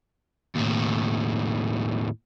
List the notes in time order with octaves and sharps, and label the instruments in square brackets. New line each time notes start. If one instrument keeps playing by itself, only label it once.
[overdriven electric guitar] D#2 A2